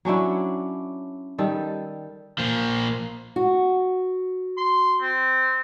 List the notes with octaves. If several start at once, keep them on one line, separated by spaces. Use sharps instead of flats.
F#3 C#4 D4 E4
D#3 G3 A4
A#2 F3
F#4
C6
C4